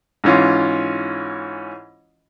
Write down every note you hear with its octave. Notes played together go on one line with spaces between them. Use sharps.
G#2 E3 C#4 F4